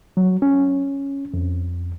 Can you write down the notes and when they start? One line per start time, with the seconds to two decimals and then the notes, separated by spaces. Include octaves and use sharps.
0.17 F#3
0.42 C#4
1.34 F2